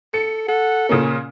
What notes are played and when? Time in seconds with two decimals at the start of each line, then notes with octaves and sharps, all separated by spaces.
0.14 A4 C#7
0.48 A4 F#5
0.89 A#2 C#3 A#3 C#4